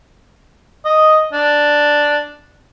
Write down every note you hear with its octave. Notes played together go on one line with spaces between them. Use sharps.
D#5
D4